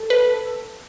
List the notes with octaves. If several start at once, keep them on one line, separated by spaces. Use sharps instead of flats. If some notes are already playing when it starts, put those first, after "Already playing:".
Already playing: A4
B4